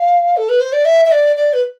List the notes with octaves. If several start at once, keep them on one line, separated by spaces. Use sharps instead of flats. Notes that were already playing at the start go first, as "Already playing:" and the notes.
Already playing: F5
A4
B4
C5
D5
E5
E5
D5
D5
B4